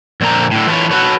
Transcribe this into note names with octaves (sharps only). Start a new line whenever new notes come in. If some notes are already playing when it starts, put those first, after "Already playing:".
F2 A#2 D3 C4 A#5
A2 D3
E3 F4 A4 B4 C#5
F#4 A4 B4 C#5